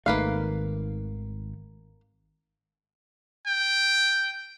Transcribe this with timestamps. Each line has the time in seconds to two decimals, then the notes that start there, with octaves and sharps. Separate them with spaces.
0.06 G#1 D#3 A3 A#3 B4 F5
3.47 G5